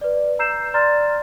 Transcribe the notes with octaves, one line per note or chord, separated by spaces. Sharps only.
B4 D5
A#5 E6 G6 C7 E7
D5 A#5 C6 F6 A6